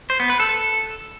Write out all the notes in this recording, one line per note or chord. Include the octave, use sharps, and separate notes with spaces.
C5
B3
B4
A4